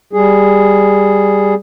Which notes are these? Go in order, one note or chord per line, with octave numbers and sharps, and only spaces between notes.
G3 G#4